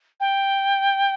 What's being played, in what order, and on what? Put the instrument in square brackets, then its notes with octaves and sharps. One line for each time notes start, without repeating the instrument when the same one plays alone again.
[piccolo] G5